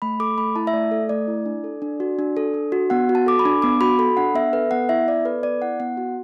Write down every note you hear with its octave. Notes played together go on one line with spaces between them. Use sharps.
A3 B5
A4 D6
A3 B5
E4 A5
E5
A3 D5
A4
A3 D5
E4
D4
A4
D4
F#4
D4
A4
D4
F#4
B3 F#5
F#4
A5
A4 D6
B5
D4
B3 D6
F#4 B5
A4 B5
D4 F#5
B3 E5
A4 B4
B3 F#5
E4 E5
B3 D5
A4 B4
B3 D5
E4 F#5
B3 F#5
F#4